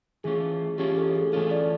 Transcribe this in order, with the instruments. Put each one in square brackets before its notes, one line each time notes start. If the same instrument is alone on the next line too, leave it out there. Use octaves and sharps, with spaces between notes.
[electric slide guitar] E3 A3 C#4 F4 [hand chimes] G#4
[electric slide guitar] E3 A3 C#4 F4 [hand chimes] G4
[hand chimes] A4
G#4
[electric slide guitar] E3 A3 C#4 F4 [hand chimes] A4
[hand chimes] D5